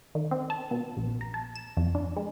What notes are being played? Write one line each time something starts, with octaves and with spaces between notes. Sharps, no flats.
D#3
C4
A5
B2
A#1
A#5
A5
E7
F2
D4
G#3